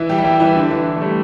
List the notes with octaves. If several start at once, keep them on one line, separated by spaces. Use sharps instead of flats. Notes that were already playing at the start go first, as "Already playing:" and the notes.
Already playing: E3 E4
G3 G4
E4
G3 G4
E3 E4
D3 D4
E3 E4
E3
A3
G3